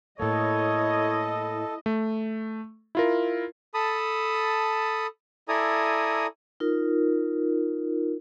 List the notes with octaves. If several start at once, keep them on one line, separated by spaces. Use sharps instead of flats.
A2 A#3 E4 A4 C#5 D#5
A3
E4 F4 A#4
A4 A5 B5 D#6
E4 A4 D5 G#5 A#5 D#6
D#4 F4 A#4